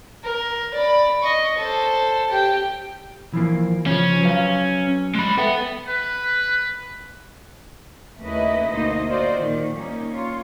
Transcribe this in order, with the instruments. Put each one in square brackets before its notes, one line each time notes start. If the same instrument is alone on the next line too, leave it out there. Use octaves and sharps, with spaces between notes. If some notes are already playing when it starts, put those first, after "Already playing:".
[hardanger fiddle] A#4
D5 B5
D#5 C#6
A4 C5
G4 G5
[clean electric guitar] E3 F3 A#3
[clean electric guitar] C#3 F3 [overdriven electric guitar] C#4
[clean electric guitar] F#3 B4 F5
[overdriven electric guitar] G#3 B5
[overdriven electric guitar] B3 [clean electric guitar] A4 E5 G5
[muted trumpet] B4
[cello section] D#2 C#3 A3 E4 B4 D#5
D2 B2 A#3 D#4 C5 D#5
F4 F#4 C5 D5 D#5
A#2 D#3
G3 A#3 C#4 D#4
F4 C#5